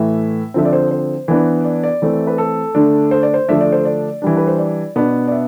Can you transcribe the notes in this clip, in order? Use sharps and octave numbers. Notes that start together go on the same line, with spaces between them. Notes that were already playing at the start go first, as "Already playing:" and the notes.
Already playing: A2 E3 A3 E5
D3 F3 C4 E5
D5
C5
C5
E3 B3 D4
D5
D5
E3 A3 C4
B4
A4
D3 A3 D4
C5
D5
C5
D3 F3 A3 D4 E5
D5
C5
D5
E3 G3 D4
B4
C5
D5
B2 B3 D4
D5
E5